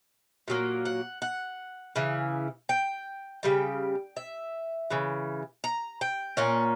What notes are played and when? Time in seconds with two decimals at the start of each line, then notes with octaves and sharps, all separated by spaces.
0.48 A#2 F#3 A#3
0.85 F#5
1.22 F#5
1.96 C#3 E3
2.69 G5
3.43 C#3 G3 G5
4.17 E5
4.91 C#3 E3
5.64 A#5
6.01 G5
6.37 A#2 A#3 C#4 F#5